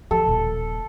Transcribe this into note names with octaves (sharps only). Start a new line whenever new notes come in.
D#2 F3 A4
D#1 A#2